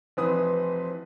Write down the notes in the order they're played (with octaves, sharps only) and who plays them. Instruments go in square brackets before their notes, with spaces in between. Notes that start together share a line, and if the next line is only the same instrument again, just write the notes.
[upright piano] F1 E3 C4 B4 D#6